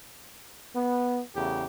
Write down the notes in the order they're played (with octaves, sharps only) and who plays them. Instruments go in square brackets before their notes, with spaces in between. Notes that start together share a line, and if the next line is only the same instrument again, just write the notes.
[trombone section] B3
E2 C#3 A3 G4